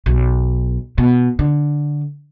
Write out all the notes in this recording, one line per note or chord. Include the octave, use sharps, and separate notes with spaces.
B1
B2
D3